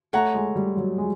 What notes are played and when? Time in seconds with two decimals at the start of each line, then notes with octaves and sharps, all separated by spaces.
0.13 A3 C#5 F#5 A#5
0.34 G#3
0.56 G3
0.77 F#3
0.98 G#3